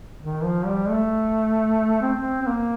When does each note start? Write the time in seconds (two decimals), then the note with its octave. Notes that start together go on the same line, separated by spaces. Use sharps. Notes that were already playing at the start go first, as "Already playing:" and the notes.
0.22 D#3
0.44 F3
0.66 G3
0.90 A3
2.02 C4
2.19 C4
2.42 C4
2.47 A#3